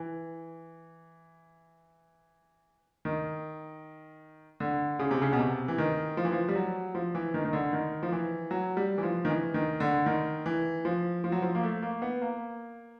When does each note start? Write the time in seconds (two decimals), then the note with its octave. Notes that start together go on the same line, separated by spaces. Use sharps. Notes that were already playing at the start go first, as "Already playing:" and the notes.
Already playing: E3
3.05 D#3
4.60 D3
4.99 C#3
5.11 C3
5.22 C#3
5.33 B2
5.39 C3
5.68 E3
5.78 D#3
6.17 F3
6.25 E3
6.32 F3
6.49 G3
6.55 F#3
6.95 F3
7.15 E3
7.34 D#3
7.45 D#3
7.53 D3
7.73 D#3
8.03 F3
8.12 E3
8.51 F#3
8.77 G3
8.98 E3
9.03 F3
9.25 D#3
9.29 E3
9.54 D#3
9.80 D3
10.06 D#3
10.46 E3
10.85 F3
11.24 F3
11.32 F#3
11.42 F3
11.55 A#3
11.63 A3
11.82 A#3
12.02 B3
12.22 A#3